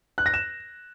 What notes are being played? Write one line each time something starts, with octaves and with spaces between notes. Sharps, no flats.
F#6
A#6
E7